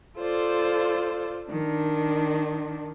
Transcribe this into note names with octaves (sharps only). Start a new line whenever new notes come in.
F4 A4 C5 D5
D#3 D4